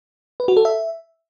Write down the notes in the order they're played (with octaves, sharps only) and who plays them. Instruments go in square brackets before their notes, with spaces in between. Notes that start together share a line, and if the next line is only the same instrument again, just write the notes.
[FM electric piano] B4
F#4
A4
E5